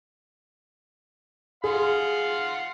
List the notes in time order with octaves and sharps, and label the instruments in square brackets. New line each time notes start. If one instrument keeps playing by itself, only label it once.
[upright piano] G#4 [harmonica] F5 F#5 C6